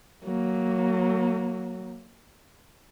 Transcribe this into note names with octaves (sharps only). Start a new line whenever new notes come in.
F#3 A#3